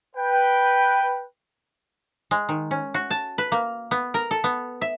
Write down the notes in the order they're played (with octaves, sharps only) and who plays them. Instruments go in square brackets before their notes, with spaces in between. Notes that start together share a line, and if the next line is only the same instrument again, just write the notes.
[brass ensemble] B4 G5
[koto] G#3
D#3
C#4
F#4
A5
B4
A#3
B3
A#4
A4
B3
E5